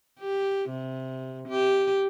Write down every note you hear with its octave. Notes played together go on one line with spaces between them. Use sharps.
G4
C3
G4